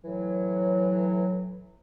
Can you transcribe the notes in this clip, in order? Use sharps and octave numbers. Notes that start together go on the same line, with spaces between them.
A2 E3 F#3